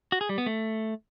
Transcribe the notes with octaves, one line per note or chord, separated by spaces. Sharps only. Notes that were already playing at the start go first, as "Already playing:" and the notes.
F#4
G#4
G3
B3
A3